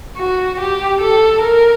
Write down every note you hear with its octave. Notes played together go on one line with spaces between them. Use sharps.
F#4
G4
A4
A#4